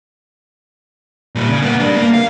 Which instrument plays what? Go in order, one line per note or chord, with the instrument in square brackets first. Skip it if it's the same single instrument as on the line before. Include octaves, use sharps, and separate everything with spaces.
[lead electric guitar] A#2 G3
C#3
A#3 B3
G3 D4
A#3
F5